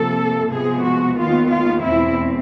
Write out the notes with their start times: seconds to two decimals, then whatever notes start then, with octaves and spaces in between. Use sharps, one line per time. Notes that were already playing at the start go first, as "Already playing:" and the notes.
Already playing: C3 F3 A#3 A4
0.50 C3 F3 G#3 B3 G#4
0.84 F#4
1.17 D#2 D#3 G#3 B3 F4
1.50 F4
1.83 E2 B2 G#3 C4 E4